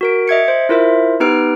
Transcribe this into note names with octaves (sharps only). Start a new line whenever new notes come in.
F#4 A#4 D7
D#5 E5 G#6 C#7
C5
E4 F4 A#4 C5 E5
B3 D#4 G4 B4 F6 D7